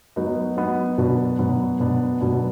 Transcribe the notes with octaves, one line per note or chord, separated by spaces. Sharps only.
F#3 B3 D#4
F#3 B3 D#4
B2 F#3 B3 D4
B2 F#3 B3 D4
B2 F#3 B3 D4
B2 F#3 B3 D4